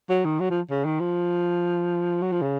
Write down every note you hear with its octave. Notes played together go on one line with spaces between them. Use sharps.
F#3
D#3
F#3
F3
C#3
D#3
F3
F#3
F3
C#3